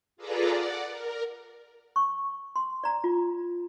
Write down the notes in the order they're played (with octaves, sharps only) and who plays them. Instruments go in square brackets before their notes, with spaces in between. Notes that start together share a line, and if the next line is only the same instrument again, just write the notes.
[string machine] F4 G#4 A4 B4 D5 A#5
D5 F#5
A#4
[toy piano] C#6
C6
D5 A#5
F4